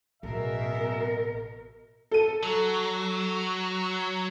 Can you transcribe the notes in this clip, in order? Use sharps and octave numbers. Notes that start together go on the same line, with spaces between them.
A1 F#2 B2 G#4 A#4 E5
A4 D#7
F#3